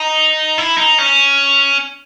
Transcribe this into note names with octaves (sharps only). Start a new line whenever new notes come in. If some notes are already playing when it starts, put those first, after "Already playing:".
Already playing: D#4
E4
D#4
C#4